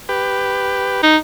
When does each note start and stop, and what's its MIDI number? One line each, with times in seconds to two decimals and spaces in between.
0.09 1.02 67
0.09 1.02 71
1.03 1.17 63